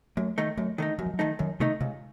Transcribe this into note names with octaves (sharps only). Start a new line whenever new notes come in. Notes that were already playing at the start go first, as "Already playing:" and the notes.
F#2 A3
D#3 A3 D#4
F#2 A3
D#3 A3 D#4
F#2 F#3
F3
F#3
D#3 A3 D#4
F#2 D#3
C3 D#3 A3 D#4
C#2 C3